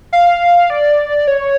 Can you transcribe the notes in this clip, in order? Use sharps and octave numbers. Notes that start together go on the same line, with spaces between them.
F5
D5
C#5